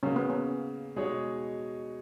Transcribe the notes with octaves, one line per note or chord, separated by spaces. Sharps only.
C#3 F#3 A#3 C#4
B3
C#4
B2 G#3 D#4 G#4 C#5